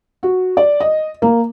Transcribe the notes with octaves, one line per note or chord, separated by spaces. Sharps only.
F#4
D5
D#5
A#3